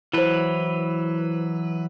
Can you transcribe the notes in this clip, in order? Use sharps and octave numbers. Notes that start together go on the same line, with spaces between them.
E3 F#3 E4 B4 C5